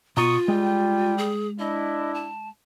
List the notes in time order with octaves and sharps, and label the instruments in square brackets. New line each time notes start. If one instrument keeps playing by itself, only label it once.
[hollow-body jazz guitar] B2 A#5 [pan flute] F4 [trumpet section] C#6 D#6
[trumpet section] G3 G5 [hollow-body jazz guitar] G#3
[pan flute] G#4
[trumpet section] D4 E4 [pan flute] D#5
[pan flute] A5